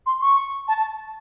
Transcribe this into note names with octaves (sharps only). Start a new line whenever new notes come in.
C6
C#6
A5